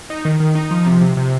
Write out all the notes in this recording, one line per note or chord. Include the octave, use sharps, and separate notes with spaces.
D#4
D#3
D#3
D#4
F3
C3
C3
C3